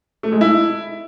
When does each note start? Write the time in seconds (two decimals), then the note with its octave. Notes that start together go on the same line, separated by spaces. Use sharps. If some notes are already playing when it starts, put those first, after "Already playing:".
0.23 A3
0.32 G#3
0.41 E4